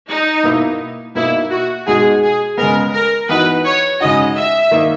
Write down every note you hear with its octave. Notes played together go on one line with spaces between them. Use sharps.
D#4
B2 A#3 E4
B2 A#3 D#4 E4
F#4
B2 G#3 D#4 F#4 G#4
G#4
C#3 G#3 B3 A#4
A#4
E3 B3 D#4 F#4 B4
C#5
C#3 G#3 D#4 F#4 D#5
E5
D#3 A#3 D#4